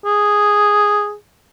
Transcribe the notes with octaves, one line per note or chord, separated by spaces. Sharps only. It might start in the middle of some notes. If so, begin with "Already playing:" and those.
G#4